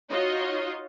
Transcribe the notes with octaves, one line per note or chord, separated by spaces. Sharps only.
D#4 F4 F#4 C#5 D#5